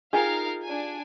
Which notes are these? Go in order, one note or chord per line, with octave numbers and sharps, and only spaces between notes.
D#4 F4 G4 G#4 A#4 F5
D4 G#5